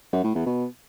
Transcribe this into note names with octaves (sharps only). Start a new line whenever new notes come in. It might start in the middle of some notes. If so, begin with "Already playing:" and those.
F#2
A2
E2
B2